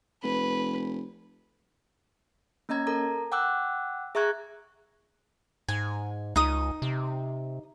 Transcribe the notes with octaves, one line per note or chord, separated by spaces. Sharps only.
F1 B4
A#3 C#4 D#5 A#5 G#6
A4 A#4 A#5
F#5 G5 D6 E6 F#6
G#4 E5 A#5 C#6 F#6 G#6
G#2 G#5
C#2 D#4 D#6
C3